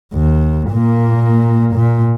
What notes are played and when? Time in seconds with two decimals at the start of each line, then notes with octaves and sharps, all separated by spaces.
0.14 D#2
0.71 A#2 A#3
1.75 A#2